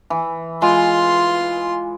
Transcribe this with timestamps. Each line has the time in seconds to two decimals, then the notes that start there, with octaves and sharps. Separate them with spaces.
0.10 E3
0.62 G#3 F4 C6